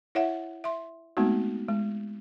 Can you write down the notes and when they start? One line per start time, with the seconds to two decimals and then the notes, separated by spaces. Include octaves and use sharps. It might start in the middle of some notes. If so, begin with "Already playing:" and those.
0.15 E4 C#5 E5 F#5
0.64 E5 C6
1.17 G#3 A3 B3 C4 D#4 F#4
1.68 G#3